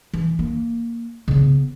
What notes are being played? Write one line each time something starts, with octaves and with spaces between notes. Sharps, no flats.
E3
A#3
C#3 B3